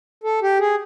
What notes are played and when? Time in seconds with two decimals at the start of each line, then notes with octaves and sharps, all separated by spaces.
0.24 A4
0.42 G4
0.59 G#4